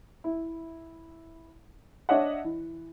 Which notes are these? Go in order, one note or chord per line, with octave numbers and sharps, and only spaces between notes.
E4
D4 C#5 D#5 E5 F#5
E3